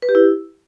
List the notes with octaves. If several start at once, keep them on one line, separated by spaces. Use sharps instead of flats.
B4
G4
E4